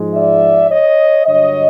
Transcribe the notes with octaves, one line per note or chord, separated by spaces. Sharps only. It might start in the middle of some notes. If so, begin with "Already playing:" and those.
Already playing: G#2 F3 G#3
D5 E5
C#5 D#5
G2 D3 F#3 C#5 D#5